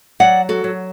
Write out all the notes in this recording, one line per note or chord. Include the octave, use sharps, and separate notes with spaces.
F#3 D5 F#5
F#4 A4
F#3